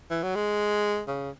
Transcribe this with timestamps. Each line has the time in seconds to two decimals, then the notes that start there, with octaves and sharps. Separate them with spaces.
0.10 E3
0.23 F#3
0.35 G#3
1.08 C#3